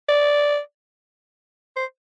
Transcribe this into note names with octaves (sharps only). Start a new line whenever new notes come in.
D5
C5